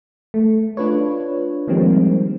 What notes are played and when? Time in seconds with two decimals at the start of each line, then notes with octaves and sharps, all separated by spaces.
0.34 A3
0.77 D4 F4 B4 C#5
1.68 D#3 F3 G3 G#3 A#3 C4